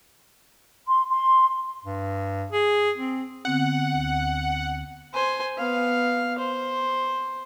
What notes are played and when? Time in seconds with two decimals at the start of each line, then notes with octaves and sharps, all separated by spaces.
0.88 C6
1.10 C6
1.85 G2
2.52 G#4
2.98 C4
3.45 D3 B3 C4 F#5
3.94 D2
5.14 C5 G#5
5.57 B3 F5
6.39 C5